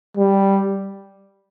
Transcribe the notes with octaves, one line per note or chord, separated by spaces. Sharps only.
G3